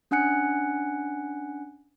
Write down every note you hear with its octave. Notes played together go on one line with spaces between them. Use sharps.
C#4 D4 F#5 G#5 F#6 C#7